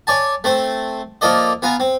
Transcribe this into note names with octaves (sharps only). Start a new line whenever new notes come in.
C#5 D5 G#5 A5
A3 C4 C5
F3 A#3 A4 D5 D#5
B3 F4 G#5 A#5
C4